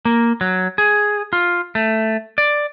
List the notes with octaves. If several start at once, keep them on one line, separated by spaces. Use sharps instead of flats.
A#3
F#3
G#4
F4
A3
D5